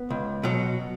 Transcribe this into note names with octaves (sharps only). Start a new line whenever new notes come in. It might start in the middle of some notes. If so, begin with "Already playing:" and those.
Already playing: B3
C#2
B2 F#3